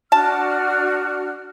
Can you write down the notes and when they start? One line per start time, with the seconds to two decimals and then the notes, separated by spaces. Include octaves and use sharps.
0.12 D4 F#4 A5 F6